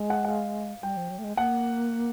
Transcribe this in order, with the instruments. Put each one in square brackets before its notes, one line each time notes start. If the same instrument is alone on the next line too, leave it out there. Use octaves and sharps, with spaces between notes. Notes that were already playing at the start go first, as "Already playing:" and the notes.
Already playing: [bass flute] G#3
[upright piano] F#5
F#5
F5
[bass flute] G3 [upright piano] G5
[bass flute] F3
F#3
A3
G#3
[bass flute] A#3 [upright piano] F#5